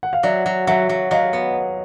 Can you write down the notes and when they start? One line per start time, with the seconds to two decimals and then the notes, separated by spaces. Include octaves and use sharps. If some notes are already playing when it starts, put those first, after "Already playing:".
0.03 F#5
0.13 F5
0.23 F#3 D5 E5
0.46 F#3
0.67 F#3 E5 F#5
0.89 F#3
1.11 F#3 D#5 F5
1.33 B3